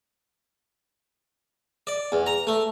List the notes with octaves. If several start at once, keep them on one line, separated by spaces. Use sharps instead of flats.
D5
E2
A#5
A3